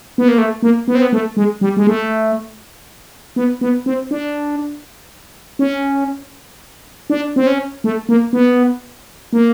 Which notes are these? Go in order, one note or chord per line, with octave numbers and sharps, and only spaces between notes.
B3
A#3
A3
A#3
B3
C4
B3
A3
G#3
G3
G#3
A3
B3
B3
C4
D4
C#4
D4
C4
C#4
A3
A#3
B3
A#3